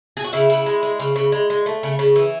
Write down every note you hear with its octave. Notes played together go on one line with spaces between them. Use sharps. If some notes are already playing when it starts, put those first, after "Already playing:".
G#4
F#4
C#3 E4
C#3
G#3
G#3
C#3
C#3
G#3
G#3
A3
C#3
C#3
E3